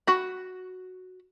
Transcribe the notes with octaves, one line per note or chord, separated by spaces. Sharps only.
F#4 B5